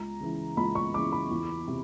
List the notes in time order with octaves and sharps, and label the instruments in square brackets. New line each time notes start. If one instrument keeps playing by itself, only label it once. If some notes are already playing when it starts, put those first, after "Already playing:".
Already playing: [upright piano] C#2 A#5
C#3 E3
C#2 B5
C#6
C#3 E3 D6
B5
E2
C3